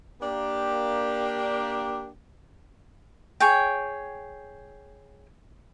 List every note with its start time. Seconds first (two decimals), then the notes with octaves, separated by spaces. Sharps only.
0.21 A#3 D4 G4
3.40 G#4 C#5 G5